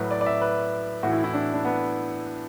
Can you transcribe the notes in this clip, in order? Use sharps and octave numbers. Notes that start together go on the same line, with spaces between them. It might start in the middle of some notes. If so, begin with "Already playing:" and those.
Already playing: A2 F#3 B4
D5
D5
E5
B4
A2 E3 F#4
E4
E4
D4
D4
B3